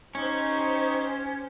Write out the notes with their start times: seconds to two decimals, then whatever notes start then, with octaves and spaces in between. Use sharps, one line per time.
0.15 C#4 D#4 G4 C5 C#6